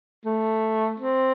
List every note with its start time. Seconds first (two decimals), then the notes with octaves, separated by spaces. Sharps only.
0.26 A3
1.00 C4